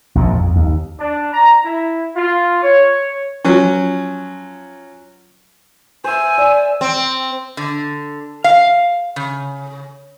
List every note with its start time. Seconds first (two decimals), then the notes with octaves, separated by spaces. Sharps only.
0.15 A#1 F#2 A#2
0.34 F2
0.56 D#2
0.99 D4
1.33 A#5
1.64 E4
2.16 F4
2.63 C#5
3.44 F3 F#3 C#4
6.04 C5 E5 G#5
6.38 D5 E5 E6
6.81 C4
7.57 D3
8.44 F5
9.16 C#3